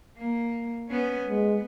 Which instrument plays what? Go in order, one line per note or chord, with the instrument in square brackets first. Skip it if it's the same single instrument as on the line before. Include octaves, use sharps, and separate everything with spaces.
[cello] A#3
B3 C#4
[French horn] G#3 [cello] B3